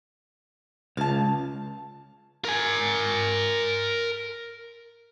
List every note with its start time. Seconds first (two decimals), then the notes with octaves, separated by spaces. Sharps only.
0.97 C#2 F5 A5
2.45 A#4 G#5